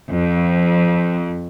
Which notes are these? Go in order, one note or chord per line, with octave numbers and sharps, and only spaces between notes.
F2